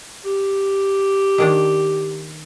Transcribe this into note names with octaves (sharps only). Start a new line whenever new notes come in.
G4
D#3 A#3 D4